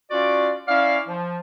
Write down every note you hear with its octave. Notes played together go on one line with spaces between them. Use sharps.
C#4 F4 F#4 D5
C#4 E4 D5 F5
F3